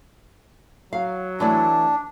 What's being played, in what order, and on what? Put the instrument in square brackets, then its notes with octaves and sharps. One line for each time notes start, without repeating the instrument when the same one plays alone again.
[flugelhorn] F#3 [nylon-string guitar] F5
[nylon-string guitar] E3 A3 D5 [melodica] D4